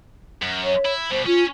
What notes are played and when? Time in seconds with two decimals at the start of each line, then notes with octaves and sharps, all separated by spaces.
0.42 F#2
0.64 C#5
0.85 E4
1.11 B2 G3 C5
1.26 C#4 F4